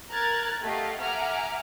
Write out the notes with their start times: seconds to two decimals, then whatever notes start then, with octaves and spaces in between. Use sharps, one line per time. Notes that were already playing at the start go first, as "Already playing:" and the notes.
0.11 A#4 A#5 F6 F#6 G#6 A6
0.63 A3 G4 D#5 F5 F#5
1.00 E5 F#5 G#5 A#5 D6 F6